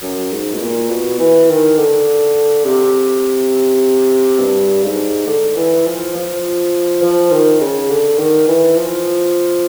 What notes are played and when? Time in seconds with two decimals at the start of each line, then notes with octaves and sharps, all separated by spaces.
0.02 F#2
0.32 G#2
0.55 B2
0.61 A#2
0.90 B2
1.19 E3
1.49 D#3
1.78 D3
2.65 C3
4.40 G2
4.83 G#2
5.27 D3
5.56 E3
5.86 F3
6.15 F3
7.02 F3
7.31 D#3
7.61 C#3
7.90 D3
8.19 D#3
8.48 E3
8.77 F3